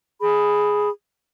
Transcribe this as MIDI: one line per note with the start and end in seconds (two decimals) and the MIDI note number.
0.20 0.89 68
0.20 0.89 83